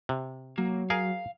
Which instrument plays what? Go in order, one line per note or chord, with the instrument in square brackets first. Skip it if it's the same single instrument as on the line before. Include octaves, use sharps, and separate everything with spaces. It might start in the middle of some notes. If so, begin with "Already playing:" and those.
[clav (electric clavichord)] C3
[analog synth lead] F#3 [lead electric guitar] A#3
[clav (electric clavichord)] G#4 A#4 [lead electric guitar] F5